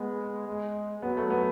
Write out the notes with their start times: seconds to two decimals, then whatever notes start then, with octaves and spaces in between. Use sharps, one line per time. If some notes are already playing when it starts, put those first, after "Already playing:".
Already playing: G#3 B3
0.47 G#3
1.02 F#3 B3
1.17 A3
1.30 B3